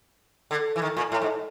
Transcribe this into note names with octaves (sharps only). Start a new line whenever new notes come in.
D3
E3
D#3
A#2
A2
G#2